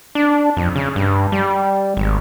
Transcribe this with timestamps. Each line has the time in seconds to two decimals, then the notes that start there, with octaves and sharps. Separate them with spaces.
0.15 D4
0.57 F2
0.76 C#3
0.96 G2
1.32 G3
1.97 G#1